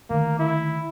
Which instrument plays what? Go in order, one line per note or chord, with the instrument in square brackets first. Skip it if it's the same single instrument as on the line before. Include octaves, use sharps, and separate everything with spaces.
[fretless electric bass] D3 D#3 A3 [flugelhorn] A#3
[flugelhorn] E4